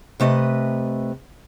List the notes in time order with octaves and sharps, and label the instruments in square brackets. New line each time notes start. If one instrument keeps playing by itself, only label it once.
[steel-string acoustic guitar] C3 A3 B4 D#5